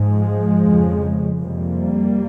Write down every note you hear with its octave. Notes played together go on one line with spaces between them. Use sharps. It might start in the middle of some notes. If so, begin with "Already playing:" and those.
Already playing: G#2 F3 G#3
F2 C#3
F2 C3 G3 A#3